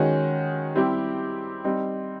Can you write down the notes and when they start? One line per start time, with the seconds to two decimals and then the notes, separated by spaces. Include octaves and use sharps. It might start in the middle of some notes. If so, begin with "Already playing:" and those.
Already playing: D#3 G#3 C#4 F#4
0.75 G3 C4 E4 G4
1.64 G3 C4 D#4